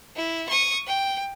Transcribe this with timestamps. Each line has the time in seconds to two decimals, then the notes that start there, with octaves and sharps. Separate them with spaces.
0.16 E4
0.49 C#6 D#6
0.87 G5